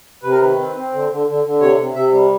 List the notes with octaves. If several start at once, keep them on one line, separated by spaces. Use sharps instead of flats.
C3 B4
A#4
D#3 B4
C4
C4
D3
D3
D3
D3
C3 C#5
C3
C3 E5
G3